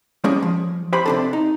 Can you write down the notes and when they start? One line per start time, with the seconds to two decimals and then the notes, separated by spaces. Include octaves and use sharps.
0.24 G3 A#3 C#4 G#4
0.42 F3
0.93 G4 C5 B5
1.06 C3 D4 A4
1.33 D#4